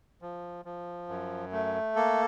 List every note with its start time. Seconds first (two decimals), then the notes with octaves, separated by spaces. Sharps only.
0.22 F3
0.65 F3
1.09 F#2
1.52 A3
1.96 A#3 A4